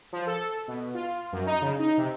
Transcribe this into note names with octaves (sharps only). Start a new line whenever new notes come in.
F3
A4
B2
F4
F#2
D#4
C#3
D#4
C3